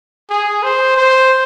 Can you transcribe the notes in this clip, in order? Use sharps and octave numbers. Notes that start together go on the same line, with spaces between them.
G#4
C5
C5